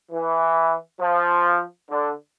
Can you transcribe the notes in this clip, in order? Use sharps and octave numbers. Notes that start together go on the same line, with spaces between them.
E3
F3
D3